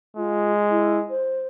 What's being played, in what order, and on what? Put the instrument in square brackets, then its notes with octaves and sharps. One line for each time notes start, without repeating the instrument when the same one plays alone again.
[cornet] G#3 [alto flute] F4
[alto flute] E4
C5